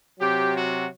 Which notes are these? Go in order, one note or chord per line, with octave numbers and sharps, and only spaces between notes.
C3 F#3 G4
F#4